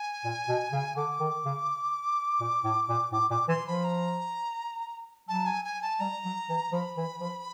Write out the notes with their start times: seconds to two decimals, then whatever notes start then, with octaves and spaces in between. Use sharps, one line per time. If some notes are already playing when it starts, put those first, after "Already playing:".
Already playing: G#5
0.24 A#2
0.49 B2
0.72 C#3
0.96 D3 D6
1.20 D#3
1.45 C#3
2.40 A#2
2.64 A2
2.89 A#2
3.12 A2 D6
3.30 A#2 D6
3.48 E3 C6
3.66 F3 B5
3.84 A#5
5.28 F#3 A5
5.46 G#5
5.65 G#5
5.82 A5
6.00 G3 A#5
6.25 F#3
6.49 E3
6.72 F3 B5
6.97 E3
7.20 F3